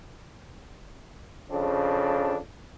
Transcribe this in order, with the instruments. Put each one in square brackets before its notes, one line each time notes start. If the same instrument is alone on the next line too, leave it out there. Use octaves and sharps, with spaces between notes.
[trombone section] F2 C#3 C4 D4